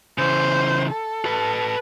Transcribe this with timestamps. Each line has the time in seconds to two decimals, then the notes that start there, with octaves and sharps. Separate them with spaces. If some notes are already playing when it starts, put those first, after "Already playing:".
0.18 C#3 E3 C5
0.90 A4
1.25 B4 A5